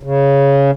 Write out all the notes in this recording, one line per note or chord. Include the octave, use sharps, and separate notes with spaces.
C#3